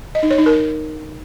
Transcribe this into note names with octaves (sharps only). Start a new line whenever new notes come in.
D#5
D#4
C#5
D#4
A#4